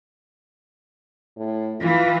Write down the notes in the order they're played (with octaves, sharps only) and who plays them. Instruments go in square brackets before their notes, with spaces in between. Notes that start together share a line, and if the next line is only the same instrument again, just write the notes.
[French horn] A2
[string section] E3 [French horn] F4